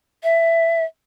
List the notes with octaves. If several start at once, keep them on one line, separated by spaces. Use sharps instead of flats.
E5